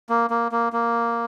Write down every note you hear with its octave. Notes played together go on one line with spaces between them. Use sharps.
A#3
A#3
A#3
A#3